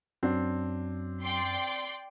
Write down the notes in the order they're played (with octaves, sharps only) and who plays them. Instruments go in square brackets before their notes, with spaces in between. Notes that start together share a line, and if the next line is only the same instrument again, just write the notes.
[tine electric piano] F#2 [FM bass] F#3 [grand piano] C4 D4
[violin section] D5 G5 C6